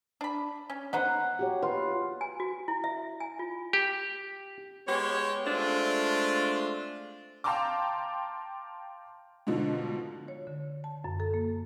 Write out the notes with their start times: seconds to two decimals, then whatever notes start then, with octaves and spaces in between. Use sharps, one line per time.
0.21 D4 B5
0.70 C#4
0.93 B3 D#4 C5 F#5
1.39 F#4 G4 C#5
1.62 F4 B4
2.21 G#5
2.40 F#4
2.68 E4
2.84 E5
3.20 G#5
3.39 F4
3.73 G4
4.88 G#3 B3 G4 C#5
5.46 G#3 A3 C4 D4 F4
7.44 F5 G5 A5 A#5 C6 D6
9.47 G#2 B2 D3 F3
10.28 C#5
10.47 D3
10.84 A5
11.04 F#2
11.20 A4
11.34 A#3